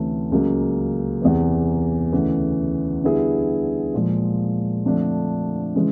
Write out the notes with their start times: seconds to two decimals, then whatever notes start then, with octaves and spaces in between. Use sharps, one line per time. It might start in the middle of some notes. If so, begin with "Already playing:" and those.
Already playing: D2 C3 E3 A3 C#4
0.32 C#2 C#3 F#3 A#3
1.22 E2 C3 E3
2.12 D2 C#3 E3
3.04 D3 G3 B3 E4 G#4
3.94 A#2 F3 G#3
4.85 F2 D3 F3 A3 D4
5.75 C#3 E3 G#3